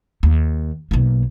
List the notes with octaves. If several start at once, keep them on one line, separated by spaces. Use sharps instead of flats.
D#2
B1 A#3